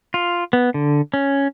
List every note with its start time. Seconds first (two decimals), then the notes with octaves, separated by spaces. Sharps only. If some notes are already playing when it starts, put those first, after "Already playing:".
0.14 F4
0.53 B3
0.74 D3
1.14 C#4